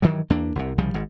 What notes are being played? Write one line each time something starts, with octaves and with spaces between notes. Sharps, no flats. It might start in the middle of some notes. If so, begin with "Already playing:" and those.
G2 D#3 E3 F#3
E2 A#3 D4
C2 C3
C2 C#3 F3 G3
G#1 G#2